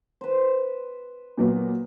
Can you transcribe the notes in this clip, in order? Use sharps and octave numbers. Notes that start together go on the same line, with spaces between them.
B4 C5
A#2 F#3 B3